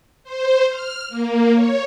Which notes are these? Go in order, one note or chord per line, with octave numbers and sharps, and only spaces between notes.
C5
F6
A#3
C#5